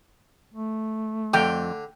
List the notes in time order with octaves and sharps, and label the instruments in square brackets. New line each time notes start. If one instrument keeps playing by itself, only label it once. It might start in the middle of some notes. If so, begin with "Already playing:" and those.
[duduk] A3
[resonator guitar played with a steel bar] F2 [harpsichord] D3 [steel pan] G5